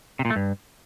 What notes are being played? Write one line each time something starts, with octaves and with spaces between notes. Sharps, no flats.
C3
A#2
A3
G2